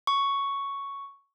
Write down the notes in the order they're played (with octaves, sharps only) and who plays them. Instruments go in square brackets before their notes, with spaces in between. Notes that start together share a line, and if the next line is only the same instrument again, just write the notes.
[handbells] C#6